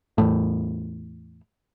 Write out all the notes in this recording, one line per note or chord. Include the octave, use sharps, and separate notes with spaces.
E2 A2